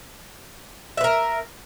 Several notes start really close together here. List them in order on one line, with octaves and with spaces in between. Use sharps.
E5 B4 A#4